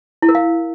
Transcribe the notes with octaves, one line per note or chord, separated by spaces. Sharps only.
E4
A#4
F5